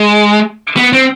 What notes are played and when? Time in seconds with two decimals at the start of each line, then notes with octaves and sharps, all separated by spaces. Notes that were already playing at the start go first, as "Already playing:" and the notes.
Already playing: G#3
0.77 B3
0.93 C4